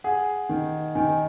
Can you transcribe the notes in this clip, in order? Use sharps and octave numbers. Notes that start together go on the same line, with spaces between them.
G#4 F#5
D#3
D#3 G#5